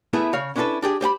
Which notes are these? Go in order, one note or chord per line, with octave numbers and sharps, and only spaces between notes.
A3 B3 E4 G#4 B4
C#3 C#5 F5
C#4 D4 E4 G4 A4 B4
D4 G4 G#4 G5
G4 C5 G5 B5